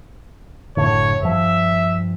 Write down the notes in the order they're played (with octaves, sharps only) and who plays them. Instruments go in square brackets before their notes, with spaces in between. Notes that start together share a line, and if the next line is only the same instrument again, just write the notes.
[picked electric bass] F#1 A2 D3 [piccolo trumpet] C#5
[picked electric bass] G2 F3 [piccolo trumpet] E5